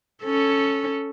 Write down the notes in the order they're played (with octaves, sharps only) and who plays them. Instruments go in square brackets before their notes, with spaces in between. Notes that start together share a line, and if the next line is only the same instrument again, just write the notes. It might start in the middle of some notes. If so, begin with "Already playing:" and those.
[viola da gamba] C#4 A4